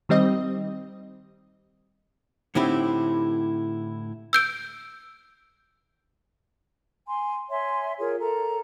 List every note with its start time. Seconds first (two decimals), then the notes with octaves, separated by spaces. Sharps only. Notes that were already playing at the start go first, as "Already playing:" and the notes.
0.09 D#3 G3 C4 D#5
2.55 A2 D3 C4 D#4 E4 G4
4.33 E6 G6 D7
7.07 G#5 C6
7.50 C#5 E5 G#5 C6
7.99 F4 G#4 A#4 C#5
8.20 A4 A#4 A#5